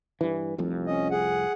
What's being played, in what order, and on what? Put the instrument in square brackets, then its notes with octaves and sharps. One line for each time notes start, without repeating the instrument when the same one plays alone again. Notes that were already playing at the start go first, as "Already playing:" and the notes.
[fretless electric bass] G2 E3
F1 C2 F2
[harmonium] C#4 D#5
G#4 F#5